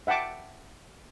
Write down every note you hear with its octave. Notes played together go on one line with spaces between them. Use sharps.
E5 F#5 G5 A5 D6